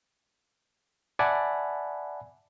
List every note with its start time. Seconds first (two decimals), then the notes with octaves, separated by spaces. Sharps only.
1.19 D5 E5 F#5 G#5 A5 B5